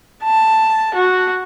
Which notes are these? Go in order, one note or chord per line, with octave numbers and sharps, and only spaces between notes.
A5
F#4